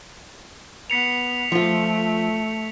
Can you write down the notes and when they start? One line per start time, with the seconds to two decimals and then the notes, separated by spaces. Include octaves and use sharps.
0.90 B3 B6 C#7 F7
1.52 F3 A3 F4